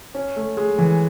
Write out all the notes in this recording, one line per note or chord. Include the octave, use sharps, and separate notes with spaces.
C#4
A3
G#3
E3